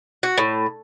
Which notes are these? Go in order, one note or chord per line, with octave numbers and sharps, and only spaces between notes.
F#4
A2